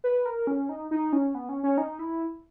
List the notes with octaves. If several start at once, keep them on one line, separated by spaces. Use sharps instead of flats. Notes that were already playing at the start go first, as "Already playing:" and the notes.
B4
A#4
C#4
D#4
D#4
C#4
B3
C#4
C#4
D#4
E4